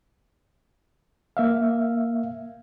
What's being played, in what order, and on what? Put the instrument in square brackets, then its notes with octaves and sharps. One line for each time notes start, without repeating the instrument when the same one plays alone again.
[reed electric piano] A#3 E5 F5